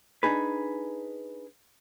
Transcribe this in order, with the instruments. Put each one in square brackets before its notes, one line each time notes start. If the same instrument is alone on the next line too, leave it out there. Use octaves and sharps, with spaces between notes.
[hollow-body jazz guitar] D4 D#4 G#4 B4